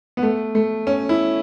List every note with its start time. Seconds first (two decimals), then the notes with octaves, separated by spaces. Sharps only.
0.17 B3
0.23 A3
0.55 A3
0.87 C#4
1.09 E4